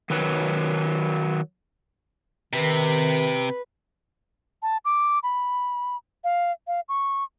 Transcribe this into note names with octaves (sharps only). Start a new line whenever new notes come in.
D#3 F#3 B4
C3 D#3 B4
A5
D6
B5
F5
F5
C#6